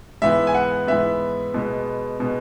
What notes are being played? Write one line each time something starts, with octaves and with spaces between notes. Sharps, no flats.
G#2 E3 B3 E5
G#5
F#5
G#2 E3 B3 E5
B2 G#3 B3
B2 G#3 B3